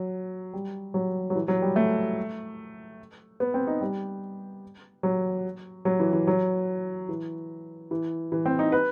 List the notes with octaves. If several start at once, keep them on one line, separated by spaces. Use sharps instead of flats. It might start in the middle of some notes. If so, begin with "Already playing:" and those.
Already playing: F#3
G3
F#3
F#3
E3
F#3
G3
A3
B3
C4
D#4
G3
F#3
F#3
E3
E3
F#3
E3
E3
E3
C4
D#4
B4